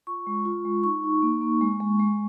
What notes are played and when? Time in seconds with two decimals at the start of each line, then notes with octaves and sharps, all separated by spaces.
0.07 F4 C#6
0.27 G#3
0.45 F4
0.65 G#3
0.84 D#4 C#6
1.03 D#4
1.22 A#3
1.41 A#3
1.61 G#3
1.80 G#3
1.99 G#3